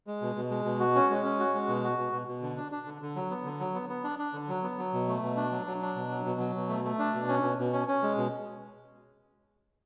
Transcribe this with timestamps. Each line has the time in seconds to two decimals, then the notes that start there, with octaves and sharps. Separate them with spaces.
0.07 G#3
0.21 B2
0.35 B2
0.50 G#3
0.65 B2
0.80 F#4
0.95 C#4
1.10 G#3
1.24 C#4
1.39 F#4
1.54 G#3
1.68 B2
1.84 F#4
1.98 B2
2.13 B2
2.27 B2
2.42 D3
2.57 D4
2.72 D4
2.86 D3
3.02 D3
3.16 F#3
3.31 B3
3.45 D3
3.60 F#3
3.74 B3
3.90 B3
4.04 D4
4.19 D4
4.33 D3
4.49 F#3
4.63 B3
4.78 F#3
4.93 B2
5.08 A3
5.22 B2
5.37 D4
5.52 F#3
5.67 F#3
5.81 D4
5.96 B2
6.11 F#3
6.26 B2
6.40 F#3
6.56 B2
6.69 A3
6.84 A3
6.99 D4
7.14 B2
7.28 C#4
7.43 B2
7.59 B2
7.73 C#4
7.88 C#4
8.03 G#3
8.18 B2